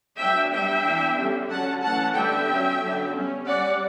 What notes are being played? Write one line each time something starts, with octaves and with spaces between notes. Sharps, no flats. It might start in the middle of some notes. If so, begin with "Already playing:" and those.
F#3 B3 D4 E5 G5
G3 D4 E5 G5
E3 B3 D4
D3 G3 C#4
D3 F#3 C#4 F#5 A5
E3 A3 C#4 F#5 A5
D3 G3 B3 D4 E5 G5
F#3 C#4
D3 F#3 B3 D4
G3 C#4
G3 C#4 D5 F#5